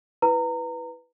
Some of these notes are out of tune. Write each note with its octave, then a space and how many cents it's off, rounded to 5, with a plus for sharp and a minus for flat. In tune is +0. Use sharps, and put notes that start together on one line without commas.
E4 +0 B4 +0 A#5 -25